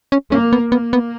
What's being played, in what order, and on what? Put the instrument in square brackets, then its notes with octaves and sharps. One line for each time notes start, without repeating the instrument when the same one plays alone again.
[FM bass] C#4
[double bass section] A#3 [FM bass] C#4
[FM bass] B3
[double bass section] A#3 [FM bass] B3
[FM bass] B3